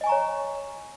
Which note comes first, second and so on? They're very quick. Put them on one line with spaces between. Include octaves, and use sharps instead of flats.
D#5 G#5 C#6 A#5 C#5